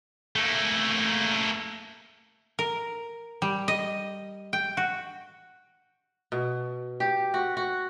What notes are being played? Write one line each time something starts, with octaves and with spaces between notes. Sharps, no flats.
A3 A#3
A#4
G3
D#5
G5
F#4
B2
G4
F#4
F#4